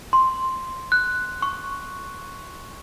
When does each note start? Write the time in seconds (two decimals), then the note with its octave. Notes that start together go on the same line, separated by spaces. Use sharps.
0.13 C6
0.92 F#6
1.42 C#6